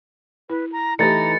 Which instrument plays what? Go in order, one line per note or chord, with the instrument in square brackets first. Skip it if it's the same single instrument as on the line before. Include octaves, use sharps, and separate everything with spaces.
[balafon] E4 [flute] B4
[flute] A#5
[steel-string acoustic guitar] E3 D#4 A4 [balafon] A3 G4 [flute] A#5 [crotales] A6 C#7